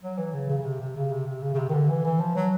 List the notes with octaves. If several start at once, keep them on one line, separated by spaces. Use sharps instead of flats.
F#3
E3
C#3
C#3
C#3
C3
C3
C#3
C3
C3
C#3
C#3
C3
D#3
D3
E3
E3
F3
F#3